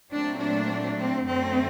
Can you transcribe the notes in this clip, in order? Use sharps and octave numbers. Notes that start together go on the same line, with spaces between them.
A#2 F#3 A3 C4 D4
D4
C4
F#2 D3 F#3 A3 C4